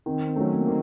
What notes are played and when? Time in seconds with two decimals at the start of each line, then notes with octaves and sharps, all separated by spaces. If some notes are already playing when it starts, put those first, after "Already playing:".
0.06 D#3 C4
0.28 C4
0.36 F#3 A3 C#4
0.58 A#3
0.67 D#3 C4